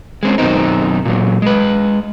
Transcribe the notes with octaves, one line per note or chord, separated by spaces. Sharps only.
G#3 C4 C#4
F#2 B2 D#3 C4 D#4
A#2 F#3
G#3 B4